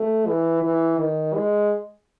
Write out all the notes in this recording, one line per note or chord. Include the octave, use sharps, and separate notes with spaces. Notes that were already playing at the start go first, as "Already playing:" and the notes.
Already playing: A3
E3
E3
D#3
G#3